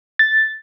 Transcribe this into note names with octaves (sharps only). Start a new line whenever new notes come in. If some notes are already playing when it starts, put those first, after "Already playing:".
A6